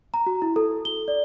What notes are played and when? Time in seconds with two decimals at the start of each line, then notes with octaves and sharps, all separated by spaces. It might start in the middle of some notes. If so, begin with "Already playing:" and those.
0.14 A#5
0.26 F#4
0.42 E4
0.56 A4
0.85 G7
1.08 D5